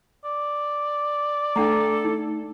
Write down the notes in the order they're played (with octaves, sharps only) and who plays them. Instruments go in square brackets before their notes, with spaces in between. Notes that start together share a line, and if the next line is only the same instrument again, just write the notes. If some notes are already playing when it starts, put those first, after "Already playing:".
[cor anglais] D5
[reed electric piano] A3 [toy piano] D4 F#5 A#5 [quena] A4
[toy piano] D#4